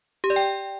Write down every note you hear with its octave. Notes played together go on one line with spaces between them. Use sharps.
G4
D5
G5